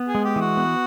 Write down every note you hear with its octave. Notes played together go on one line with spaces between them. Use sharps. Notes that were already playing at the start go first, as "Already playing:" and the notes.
Already playing: B3
G#4
G#3
G4
E3
F#4
B3